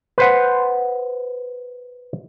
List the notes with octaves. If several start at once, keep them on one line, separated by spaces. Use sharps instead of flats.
B4 C5 F#5